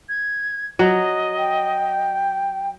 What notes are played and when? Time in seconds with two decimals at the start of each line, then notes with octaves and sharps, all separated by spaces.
0.09 G#6
0.79 F#3 D#5
1.38 G5